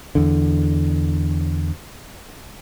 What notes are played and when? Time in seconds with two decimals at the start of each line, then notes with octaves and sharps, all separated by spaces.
0.15 E2 D3